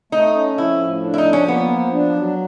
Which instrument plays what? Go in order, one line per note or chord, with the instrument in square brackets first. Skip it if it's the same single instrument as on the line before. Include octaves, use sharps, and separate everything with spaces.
[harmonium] A3 [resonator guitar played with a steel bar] D#4
[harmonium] C#4
[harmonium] F3 [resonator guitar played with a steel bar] E4
[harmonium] A2
D4
[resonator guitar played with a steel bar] E4
D#4
[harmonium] F3
[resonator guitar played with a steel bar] C#4
[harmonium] A#3 [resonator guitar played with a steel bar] B3
[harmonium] F3
D4
F#3